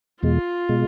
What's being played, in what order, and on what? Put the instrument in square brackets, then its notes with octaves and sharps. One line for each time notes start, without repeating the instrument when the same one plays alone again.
[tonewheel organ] E2 B2 G#3 [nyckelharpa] F4
[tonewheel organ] B2 G#3